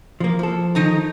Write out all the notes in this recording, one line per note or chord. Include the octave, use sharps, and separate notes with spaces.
F3 A#3
F3 A4
D#3 D#4 A#5